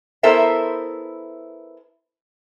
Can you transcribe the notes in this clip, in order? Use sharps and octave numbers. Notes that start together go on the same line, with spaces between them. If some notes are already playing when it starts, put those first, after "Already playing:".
B3 E4 A4 A#4 C5 E5